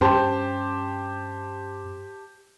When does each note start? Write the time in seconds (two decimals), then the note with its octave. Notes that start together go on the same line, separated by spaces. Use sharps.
0.01 G2 C#4 G4 C5 A5